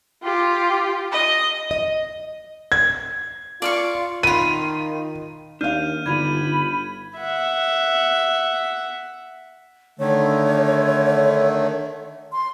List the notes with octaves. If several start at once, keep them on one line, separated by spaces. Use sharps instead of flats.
F4 G4
D#5
D#5
G#6
F4 D5 F5 C#6
D#3 F4 B5 D#7
D#2 D4 F5 F6 G6 D#7
G1 D3 D#4 F4 B5 G#6 D#7
E5 F#5
D3 D#3 A3 C#5
C6